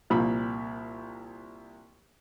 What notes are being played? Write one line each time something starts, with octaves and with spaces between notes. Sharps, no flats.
C2 A#2 F3 B5